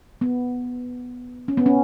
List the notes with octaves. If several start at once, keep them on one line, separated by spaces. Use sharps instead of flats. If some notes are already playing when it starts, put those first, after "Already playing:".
B3
C#4
B3
C#4